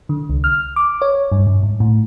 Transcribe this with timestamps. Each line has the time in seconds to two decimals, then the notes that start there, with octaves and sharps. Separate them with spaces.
0.09 D3
0.30 C2
0.44 F6
0.76 D6
1.02 C#5
1.32 G2
1.47 G2
1.63 G#2
1.80 A2